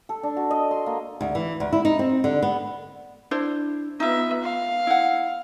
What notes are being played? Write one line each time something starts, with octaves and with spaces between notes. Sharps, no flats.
A4
D4
F#4
D#5
C6
A#3
D2
E3
D2
E4
D#4
C4
D3
B3
D4 E4 C5
B3 D#4 F4 E5
F5
E4 F#5